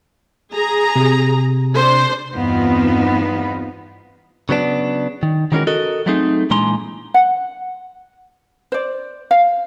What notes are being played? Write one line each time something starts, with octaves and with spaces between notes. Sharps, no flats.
G#4 A#5
C3
D4 C5
E2 G2 B3 C4 D#4 F4
C#3 F#3 B3 D4
D#3
D#3 E3 G#3 C#4 F#4 A#4
F#4 A4 A#4 D#5
F#3 G3 A3 C4 D#4 G#4
A#2 E3 G#3 D4 A#5 C6
F#5
C5 D5
F5